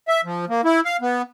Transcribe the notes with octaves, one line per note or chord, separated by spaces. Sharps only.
E5
F3
A#3
E4
F5
B3